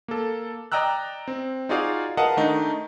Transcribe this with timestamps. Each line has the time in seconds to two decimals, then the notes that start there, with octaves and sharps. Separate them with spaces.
0.08 A#3 A4
0.72 D5 D#5 G5 A#5 E6 F#6
1.28 C4
1.69 D#4 F4 F#4 G#4 D5 F5
2.17 A#4 B4 D#5 F5 F#5 A5
2.37 D#3 A3 D4 D#4